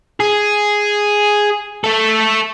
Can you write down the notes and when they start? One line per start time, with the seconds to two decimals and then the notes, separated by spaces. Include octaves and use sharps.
0.20 G#4
1.84 A3 A4